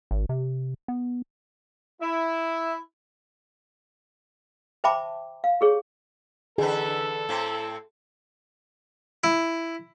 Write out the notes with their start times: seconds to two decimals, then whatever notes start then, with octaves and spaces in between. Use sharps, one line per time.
0.11 G#1
0.29 C3
0.88 B3
2.02 E4
4.84 C5 E5 G5 A5 B5 D6
5.44 F5
5.61 G4 G#4 C#5
6.58 D3 E3 G#4 A4 B4
7.29 A2 C4
9.24 E4